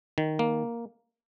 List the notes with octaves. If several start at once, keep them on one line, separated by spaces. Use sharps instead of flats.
D#3
A#3